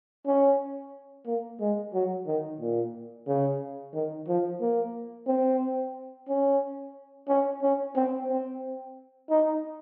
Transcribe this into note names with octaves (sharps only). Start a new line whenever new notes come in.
C#4
A#3
G#3
F#3
D#3
A#2
C#3
D#3
F3
A#3
C4
C#4
C#4
C#4
C4
C4
D#4